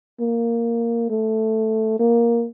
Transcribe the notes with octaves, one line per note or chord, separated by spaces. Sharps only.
A#3
A3
A#3